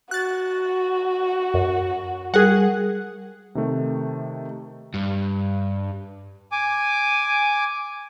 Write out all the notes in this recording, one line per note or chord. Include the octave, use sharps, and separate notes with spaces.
F#4 F#6 A6
F#2
G3 G#4 A#4 F#5 F#6
C3 D#3 A3
G2
G#5 D6